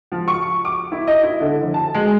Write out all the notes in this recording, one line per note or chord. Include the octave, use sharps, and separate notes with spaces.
F3
C#6
D6
E4
D#5
E4
D3
F1
A5
G#3